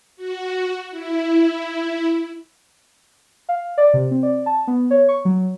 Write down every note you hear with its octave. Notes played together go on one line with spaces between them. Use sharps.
F#4
E4
F5
D5
C3
C4
D5
A5
B3
C#5
C#6
F#3